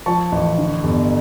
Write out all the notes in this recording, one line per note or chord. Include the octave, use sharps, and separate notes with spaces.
F3 A5 C#6
A1
D3
G1